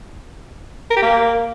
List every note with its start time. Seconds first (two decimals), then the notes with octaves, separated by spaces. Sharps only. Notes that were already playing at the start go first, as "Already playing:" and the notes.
0.91 A#4
0.96 G4
1.02 A#3